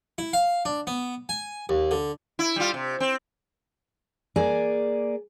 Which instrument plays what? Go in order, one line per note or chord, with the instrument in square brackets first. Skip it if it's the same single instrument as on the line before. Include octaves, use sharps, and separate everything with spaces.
[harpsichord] E4
F5
D4
B3
G#5
D#2
D3
[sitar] E4
G3 F4
C3
C4
[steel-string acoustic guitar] A#3 G#4 D5 G#5